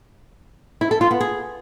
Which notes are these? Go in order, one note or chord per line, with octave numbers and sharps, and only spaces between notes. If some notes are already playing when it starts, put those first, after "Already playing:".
E4
A4
F4
B3
G#4